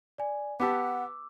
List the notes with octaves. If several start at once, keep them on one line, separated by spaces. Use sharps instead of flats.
D5 G#5
B3 G4 F#5 A5 D6 E6